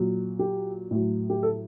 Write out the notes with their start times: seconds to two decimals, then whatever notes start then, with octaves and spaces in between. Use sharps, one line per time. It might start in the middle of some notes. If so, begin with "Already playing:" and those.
Already playing: A#2 F#3
0.39 G4
0.91 A2 F#3
1.30 G4
1.43 A4